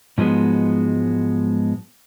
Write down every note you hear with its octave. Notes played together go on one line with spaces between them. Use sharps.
G#2 F3 F#3 G#3 B3